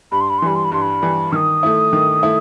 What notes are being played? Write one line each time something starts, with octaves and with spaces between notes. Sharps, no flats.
G2 B5
C6
B5
C6
E3 G3 B5
C6
B5
G2 C6
B5
E3 G3
D#3 D#6 F6
A3 E4
D#3
A3 E4